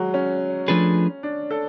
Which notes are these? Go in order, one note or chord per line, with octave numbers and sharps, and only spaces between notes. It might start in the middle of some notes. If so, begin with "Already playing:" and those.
Already playing: F#3 G#3
C#4
F3 A3 D4 G#4 B4
D4
A4